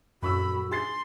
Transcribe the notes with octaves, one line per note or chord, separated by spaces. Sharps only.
D#1 F#2 F#4 B5 C#6 E6
G#4 C6 A6 C7